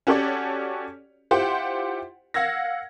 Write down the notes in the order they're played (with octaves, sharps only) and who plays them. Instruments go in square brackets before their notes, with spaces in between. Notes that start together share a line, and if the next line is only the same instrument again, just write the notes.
[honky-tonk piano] C#4 F#4 G4 A4 C#5 D5
E4 F4 G4 C5 F#5 G5
F5 F#5 E6 G#6 A#6